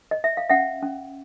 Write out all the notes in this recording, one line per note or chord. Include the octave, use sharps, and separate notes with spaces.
D#5
E5
F5
C#4 E5 F#5
C#4